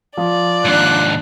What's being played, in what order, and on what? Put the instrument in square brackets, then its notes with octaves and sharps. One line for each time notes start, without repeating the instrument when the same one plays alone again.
[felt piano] F3 [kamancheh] D5
[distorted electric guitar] D#2 G#2 [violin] D4 F#6